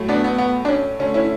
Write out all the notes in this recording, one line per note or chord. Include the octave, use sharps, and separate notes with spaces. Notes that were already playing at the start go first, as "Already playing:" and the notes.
Already playing: A2 F#3 A3
B3 D4
B3
B3
D4
C#4
D3 A3 C#4
C#4 E4